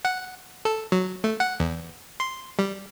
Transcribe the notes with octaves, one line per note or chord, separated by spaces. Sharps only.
F#5
A4
F#3
A3
F#5
E2
C6
G3